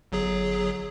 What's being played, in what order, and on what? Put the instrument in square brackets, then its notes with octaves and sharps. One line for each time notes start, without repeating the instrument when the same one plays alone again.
[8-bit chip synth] G1 F#3 G#4